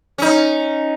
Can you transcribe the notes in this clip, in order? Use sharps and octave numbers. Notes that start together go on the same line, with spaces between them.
C#4 D#4